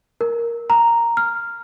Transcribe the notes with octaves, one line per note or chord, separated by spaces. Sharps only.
A#4
A#5
F6